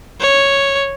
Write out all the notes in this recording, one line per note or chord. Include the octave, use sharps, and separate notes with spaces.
C#5